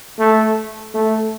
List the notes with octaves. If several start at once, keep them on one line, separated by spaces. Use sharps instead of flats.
A3
A3